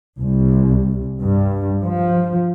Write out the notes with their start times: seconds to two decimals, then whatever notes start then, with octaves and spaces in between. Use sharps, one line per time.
0.19 C2
1.20 G2
1.84 F3